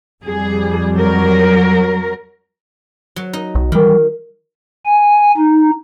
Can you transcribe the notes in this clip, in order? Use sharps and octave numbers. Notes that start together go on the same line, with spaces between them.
F2 G3 G#4
F#3 A#4
F#3
D#4
B1
D#3 E3 G3
G#5
D#4